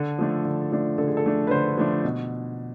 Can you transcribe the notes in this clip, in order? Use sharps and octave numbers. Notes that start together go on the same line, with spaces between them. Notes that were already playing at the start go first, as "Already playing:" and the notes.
Already playing: D3 A4
F3 A3 D4
D3
F3 A3 D4
D3 A4
G#4
A4
F3 A3 D4
B4
D3 C5
F3 A3 D4
B2